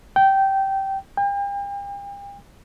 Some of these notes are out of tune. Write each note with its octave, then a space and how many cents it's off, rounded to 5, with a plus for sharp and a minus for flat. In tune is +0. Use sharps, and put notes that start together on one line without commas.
G5 -15
G5 +40